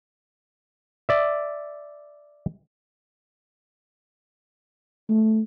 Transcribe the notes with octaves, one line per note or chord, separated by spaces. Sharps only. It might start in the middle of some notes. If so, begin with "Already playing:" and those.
D5 E5
A3